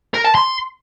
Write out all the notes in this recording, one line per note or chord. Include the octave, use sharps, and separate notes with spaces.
A#4
A5
C6